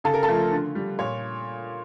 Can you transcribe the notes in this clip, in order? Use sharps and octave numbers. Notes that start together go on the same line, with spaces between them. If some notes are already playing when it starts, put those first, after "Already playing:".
C#3 A4
A#4
A4
F3 A3
D3
G3
A#2 C#5